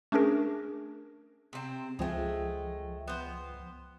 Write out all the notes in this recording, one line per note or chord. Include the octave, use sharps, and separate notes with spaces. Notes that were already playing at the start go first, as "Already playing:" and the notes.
A3 C#4 D4 G#4 A#4
C3 C4
C#2 F3 G#3 A3 G5
B3 C5